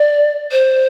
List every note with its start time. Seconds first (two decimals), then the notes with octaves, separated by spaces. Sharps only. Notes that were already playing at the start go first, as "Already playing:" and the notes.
Already playing: D5
0.51 C5